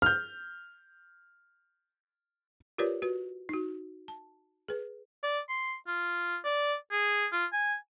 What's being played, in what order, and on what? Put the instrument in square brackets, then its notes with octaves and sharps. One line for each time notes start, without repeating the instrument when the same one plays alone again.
[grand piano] F6 G6
[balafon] F4 G4 A#4 B4 C#5 D5
F#4 B4
D#4 F#4
A5
G#4 B4
[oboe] D5
C6
F4
D5
G#4
F4
G#5